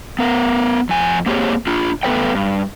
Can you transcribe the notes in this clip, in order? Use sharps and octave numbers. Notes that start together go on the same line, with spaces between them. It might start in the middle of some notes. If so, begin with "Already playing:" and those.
B3 A#4
F2 G#5
A#3 C4 G4 G#4 C#5
D4 F4
A3 B3 A4 B4 C#5 G5
G2